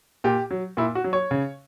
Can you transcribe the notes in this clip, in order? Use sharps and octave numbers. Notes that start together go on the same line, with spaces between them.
A#2 G4
F#3
A#2 E4
F#4
F#3
C#5
C#3